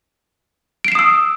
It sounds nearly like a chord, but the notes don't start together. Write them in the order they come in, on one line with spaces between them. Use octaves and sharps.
D7 C7 E7 D#6 E6